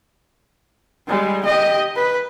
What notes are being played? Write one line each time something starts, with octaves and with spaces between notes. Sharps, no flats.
G3 G#3
G4 D#5
B4